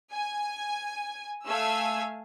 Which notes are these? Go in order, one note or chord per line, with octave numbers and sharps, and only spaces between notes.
G#5
A3 F5 G#5 E6